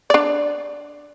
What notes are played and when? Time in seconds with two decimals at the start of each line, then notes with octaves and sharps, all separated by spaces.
0.10 D4 D5